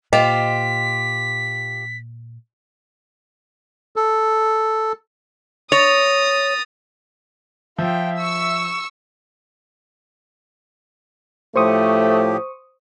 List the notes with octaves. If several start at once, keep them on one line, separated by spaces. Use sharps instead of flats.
A#2 F4 G4 C5 D#5 B6
A4
C#5 D#6 A6 A#6 F7
F3 F4 E5 G5
C#6 E6
A2 F3 A3 G4 C5 C#6 D#6